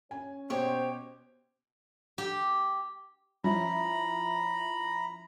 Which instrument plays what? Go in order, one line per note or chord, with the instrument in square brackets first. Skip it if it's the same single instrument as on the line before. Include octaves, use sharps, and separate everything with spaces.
[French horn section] C#4 [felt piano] G#5
[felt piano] B2 [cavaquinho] G4 C#5 [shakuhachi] C5
[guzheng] G4
[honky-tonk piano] F3 C#4 E4 [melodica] A#5 B5